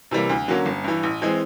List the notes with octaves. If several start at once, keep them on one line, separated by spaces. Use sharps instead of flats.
C3 E3 G3 A#3
D2
D3 F#3 A#3 C#4
G1
G2 E3
A1
E3 G#3 C4